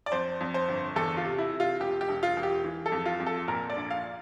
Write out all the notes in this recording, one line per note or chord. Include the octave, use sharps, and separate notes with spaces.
D5
F2 C5
F2
C5
G1
E2 A4
F4
C3
E4
C3
F4
E1 G4
G4
E1
F4
E1
G4
E3
A4
F2
F4
F2
A4
A#2 A#4
D5
A#1
F5